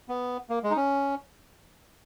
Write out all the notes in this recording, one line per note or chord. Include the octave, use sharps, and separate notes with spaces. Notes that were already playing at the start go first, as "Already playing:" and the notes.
B3
A#3
G#3
D#4
C#4